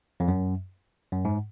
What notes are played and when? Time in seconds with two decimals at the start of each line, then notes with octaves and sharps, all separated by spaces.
0.20 F2
0.28 F#2
1.13 F#2
1.25 G#2